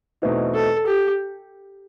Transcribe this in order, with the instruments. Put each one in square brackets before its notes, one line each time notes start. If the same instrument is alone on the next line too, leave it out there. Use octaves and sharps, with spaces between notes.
[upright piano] E2 B2 A3 C4 D#4
[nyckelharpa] A4
G4